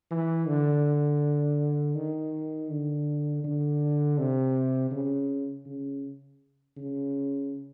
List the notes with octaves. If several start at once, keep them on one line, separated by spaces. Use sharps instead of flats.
E3
D3
D#3
D3
D3
C3
C#3
C#3
C#3